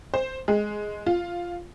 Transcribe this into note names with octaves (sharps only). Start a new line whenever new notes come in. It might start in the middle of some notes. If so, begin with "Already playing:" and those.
C5
G#3
F4